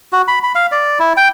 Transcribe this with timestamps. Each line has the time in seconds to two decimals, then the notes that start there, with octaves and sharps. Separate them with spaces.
0.13 F#4
0.28 B5
0.43 B5
0.55 F5
0.72 D5
0.99 E4
1.17 G5